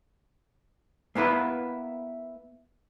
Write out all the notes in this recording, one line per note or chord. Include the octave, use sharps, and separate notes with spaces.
A#3 B3 E4 B4